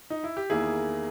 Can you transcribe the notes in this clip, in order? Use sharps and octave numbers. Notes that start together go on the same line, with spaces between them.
D#4
E4
G4
E2 D#3 A#3 E4 G#4